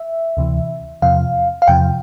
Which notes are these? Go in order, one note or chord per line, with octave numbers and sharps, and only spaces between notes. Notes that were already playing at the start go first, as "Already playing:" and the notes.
Already playing: E5
D2 C3 E3
E2 C3 F3 F5
F5
E2 C3 F3 G5